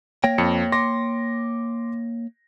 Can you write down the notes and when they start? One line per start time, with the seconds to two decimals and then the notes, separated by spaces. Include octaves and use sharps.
0.24 A#3 C#5 G5 A#6
0.38 F2 C#7
0.72 C6 D6 A#6